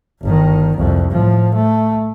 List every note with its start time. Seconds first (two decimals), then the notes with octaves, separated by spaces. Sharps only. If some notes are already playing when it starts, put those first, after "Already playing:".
0.22 G1 D#3
0.77 C2 F2
1.11 A2 F3
1.55 A3